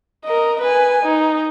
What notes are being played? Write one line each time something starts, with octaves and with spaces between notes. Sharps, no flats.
A#4 D#5
B4 G#5
D#4